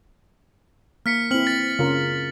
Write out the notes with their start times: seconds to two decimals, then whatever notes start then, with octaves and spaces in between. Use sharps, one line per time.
1.06 A#3 F6 B6 C#7
1.31 C4 E4 F6 F#7
1.47 A6
1.79 C#3 F4 A#4